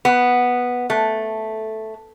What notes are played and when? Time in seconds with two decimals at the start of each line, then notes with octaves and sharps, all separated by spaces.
0.05 B3
0.90 A3